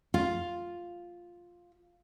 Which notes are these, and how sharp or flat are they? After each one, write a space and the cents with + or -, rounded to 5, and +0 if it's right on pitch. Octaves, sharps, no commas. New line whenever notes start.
F4 +0